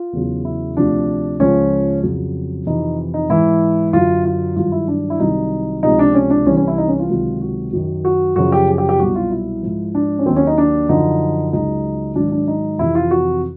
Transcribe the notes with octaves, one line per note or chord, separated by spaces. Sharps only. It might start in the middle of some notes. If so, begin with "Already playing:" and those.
Already playing: F4
E2 C#3 F#3
E4
D2 C3 F3 D4
C#2 C#3 F3 C#4
F2 C#3 F#3
F2 C3 E3 D#4
D#4
G#2 E3 E4
F#2 D3 F#3 F4
F4
G2 D#3 F#3 F4
E4
D4
E4
C2 C3 D#3 F#3 D#4
C#2 C3 F3 D#4
D4
C#4
D4
C2 C3 E3 C#4
C#4
E4
D#4
C#4
F4
C#2 C3 D#3 F#3
F#4
F#2 D#3 F#3
F#4
F#2 C#3 F3 F#4
G4
G#4
G4
G4
C2 B2 F#3 F#4
F4
E4
G#2 F3
D4
C#4
D#2 D#3 F#3 C4
C#4
D#4
D4
F#2 D3 F3 D#4
C#2 C#3 F#3 D#4
G#2 D#3 F#3 D4
D4
D#4
F2 C3 E3 E4
F4
F#4